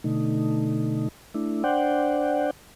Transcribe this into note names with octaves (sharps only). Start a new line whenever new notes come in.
B2 D3 A3 D#4
A3 D4 E4
D4 C5 D5 F#5 G5